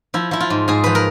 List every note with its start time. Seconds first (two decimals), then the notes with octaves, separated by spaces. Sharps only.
0.14 F3 E4
0.31 F3 E4
0.40 F4
0.50 G#2
0.68 G#2 G#4
0.84 F3 B4
0.95 A#4